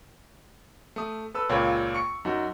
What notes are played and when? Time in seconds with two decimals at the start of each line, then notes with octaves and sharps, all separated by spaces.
0.96 A3 D#6
1.34 A4 B4 E6
1.49 C#2 A#2 C#5 F5 B5
1.94 C#6 C#7
2.25 F#2 D#4 F#4